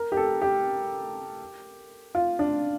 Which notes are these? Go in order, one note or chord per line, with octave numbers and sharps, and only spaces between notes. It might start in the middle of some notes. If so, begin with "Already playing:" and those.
Already playing: A#4
G4
A4
G4
F4
D4